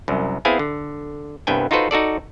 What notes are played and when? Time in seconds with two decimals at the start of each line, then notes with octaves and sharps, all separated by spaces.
0.08 C2 F#2
0.45 B3 C4 E4 G#4 F5 G#5
0.59 D3
1.47 C2 G2 B3 G5 G#5
1.71 D#4 F4 F#4 A4 B4 C5
1.91 D#4 F#4 A4 D5